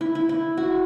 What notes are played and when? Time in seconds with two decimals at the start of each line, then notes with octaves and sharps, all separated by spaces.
0.01 E4
0.15 E4
0.29 E4
0.57 F#4